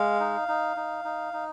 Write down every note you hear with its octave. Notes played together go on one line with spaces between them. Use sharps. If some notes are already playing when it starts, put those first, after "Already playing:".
Already playing: G#3 F5
D#4
D#4
D#4
D#4
D#4